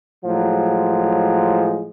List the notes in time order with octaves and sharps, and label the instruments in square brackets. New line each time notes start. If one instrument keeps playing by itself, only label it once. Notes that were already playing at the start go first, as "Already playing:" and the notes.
[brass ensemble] A2 F3 F#3 G#3